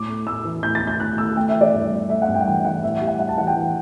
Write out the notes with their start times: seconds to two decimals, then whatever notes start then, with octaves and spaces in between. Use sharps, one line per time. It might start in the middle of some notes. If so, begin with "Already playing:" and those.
Already playing: A2 D6
0.08 A3
0.27 A2 E6
0.45 E3
0.63 A2 G6
0.75 A6
0.81 A2
0.87 G6
1.00 A2 F#6
1.18 A3 E6
1.36 A3 G5
1.49 E5
1.55 E3
1.61 D5
1.73 G2
1.92 G2
2.10 A3 E5
2.22 F#5
2.28 G2
2.35 G5
2.41 F#5
2.46 E3 G5
2.64 E3 F#5
2.83 A2 E5
2.95 E5
3.01 G3
3.07 F#5
3.19 G3 F#5
3.29 A5
3.38 E3 F#5
3.47 G5
3.56 E3